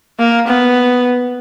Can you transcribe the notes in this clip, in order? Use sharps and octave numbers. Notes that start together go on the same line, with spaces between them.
A#3
B3